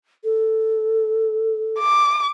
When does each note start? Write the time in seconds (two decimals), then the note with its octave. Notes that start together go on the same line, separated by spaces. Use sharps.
0.24 A4
1.79 D6